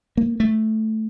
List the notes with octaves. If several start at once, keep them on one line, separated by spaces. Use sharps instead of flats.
A#3
A3